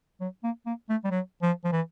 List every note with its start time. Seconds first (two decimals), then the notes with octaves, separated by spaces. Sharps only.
0.21 F#3
0.43 A#3
0.66 A#3
0.89 A3
1.04 G3
1.11 F#3
1.42 F3
1.64 F3
1.72 E3